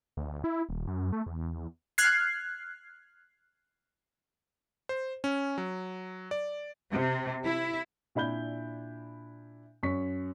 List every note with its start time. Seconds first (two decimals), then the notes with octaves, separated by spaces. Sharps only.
0.17 D2
0.44 E4
0.69 D#1
0.87 F#2
1.12 A3
1.26 E2
1.98 F6 F#6 G#6 C7
4.89 C5
5.24 C#4
5.58 F#3
6.31 D5
6.90 C3
7.45 E4
8.15 A#2 D4 E4 B5 G6 G7
9.83 F#2 C#5 C#6 B6